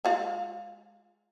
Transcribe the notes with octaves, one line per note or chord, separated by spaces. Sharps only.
G#3 F4 F5